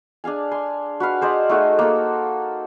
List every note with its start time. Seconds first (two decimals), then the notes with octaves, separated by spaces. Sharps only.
0.24 D4 G#4 F5 G#5
0.51 G#5 C6
1.00 F#4 B4 F5
1.21 G#4 C5 D5 D#5
1.49 A3 D#4 F#4 G#4
1.79 A#3 A4